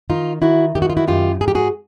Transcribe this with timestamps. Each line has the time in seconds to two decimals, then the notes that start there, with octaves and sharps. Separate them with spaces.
0.10 D#3 D#4 F4
0.42 D#3 E4 F#4
0.75 D#3 G4
0.82 F#4
0.90 F4
0.97 E4 F#4
1.07 F#2 F4 G4
1.41 G#2 G#4
1.48 G4
1.55 F#4 G#4